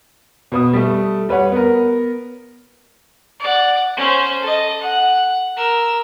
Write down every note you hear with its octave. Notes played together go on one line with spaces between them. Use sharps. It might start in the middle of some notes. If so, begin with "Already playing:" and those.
B2 B4 D#6
G3 A3
G3 B4 C#5 F#5
B3 A#4
D5 F#5
C#4 C5
A4 D#5
F#5
A#4 E6